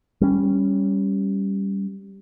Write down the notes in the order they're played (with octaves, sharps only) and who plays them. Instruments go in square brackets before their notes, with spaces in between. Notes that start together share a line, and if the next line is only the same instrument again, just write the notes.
[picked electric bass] G3 C#4